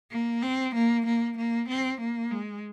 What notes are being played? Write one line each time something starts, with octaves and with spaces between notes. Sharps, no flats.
A#3
C4
A#3
A#3
A#3
C4
A#3
G#3